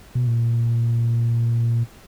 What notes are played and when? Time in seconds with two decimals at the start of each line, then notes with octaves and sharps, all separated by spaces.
0.15 B2
0.27 A#2